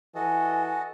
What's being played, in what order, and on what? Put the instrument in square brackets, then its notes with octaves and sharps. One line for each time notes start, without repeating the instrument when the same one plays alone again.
[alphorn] E3 [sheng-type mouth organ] F#4 A4 D#5 [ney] G#5